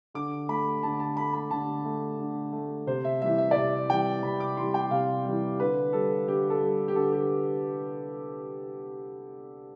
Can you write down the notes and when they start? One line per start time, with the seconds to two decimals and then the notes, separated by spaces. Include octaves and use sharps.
0.14 D3 D6
0.49 A3 B5
0.83 D3 A5
1.00 A5
1.17 A3 B5
1.34 B5
1.51 D3 A5
1.85 A3
2.19 D3
2.53 A3
2.87 C3 C5
3.05 E5
3.21 E3 G3 E5
3.38 E5
3.51 D5
3.55 C3 E5
3.89 E3 G3 G5
4.23 C3 B5
4.40 D6
4.57 E3 G3 C6
4.74 G5
4.91 C3 F5
5.25 E3 G3
5.60 D3 B4
5.93 G3 A4
6.28 D3 G4
6.50 A4
6.61 G3
6.88 G4
6.95 D3 A4
7.12 G4